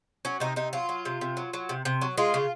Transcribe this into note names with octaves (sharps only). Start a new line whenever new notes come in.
F#3 C#4
C3 D#4
C3 D#4
F#3 F4
F#3
C3
C3
F#3
F#3
C3
C3
F#3
G#3 F4
C#3